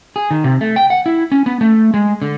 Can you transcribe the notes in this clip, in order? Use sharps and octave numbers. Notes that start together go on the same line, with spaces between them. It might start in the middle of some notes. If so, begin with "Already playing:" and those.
G#4
D#3
C3
A3
G5
F#5
E4
C#4
B3
A3
G#3
D3